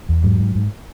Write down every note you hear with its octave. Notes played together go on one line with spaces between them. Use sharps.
E2
G#2 F#3
G#2
G#2